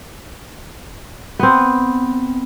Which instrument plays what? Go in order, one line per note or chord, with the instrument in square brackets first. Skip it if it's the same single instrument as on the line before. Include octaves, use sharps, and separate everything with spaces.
[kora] B3 C4